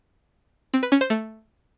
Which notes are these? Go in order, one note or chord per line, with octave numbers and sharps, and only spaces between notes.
C4
B4
C#4
C5
A3